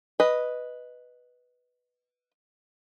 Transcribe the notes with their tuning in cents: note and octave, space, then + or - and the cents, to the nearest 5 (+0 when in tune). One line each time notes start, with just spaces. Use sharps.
B4 +0 D#5 +0